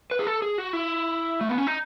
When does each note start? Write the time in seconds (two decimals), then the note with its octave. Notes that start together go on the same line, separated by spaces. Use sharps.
0.11 B4
0.19 G#4
0.27 A4
0.42 G#4
0.58 F#4
0.73 E4
1.41 A3
1.49 B3
1.58 C#4
1.67 D#4